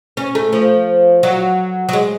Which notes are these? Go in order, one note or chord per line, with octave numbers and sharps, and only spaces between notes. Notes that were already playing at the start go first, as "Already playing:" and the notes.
C#4
A3
F3
F#3
F#3
G#3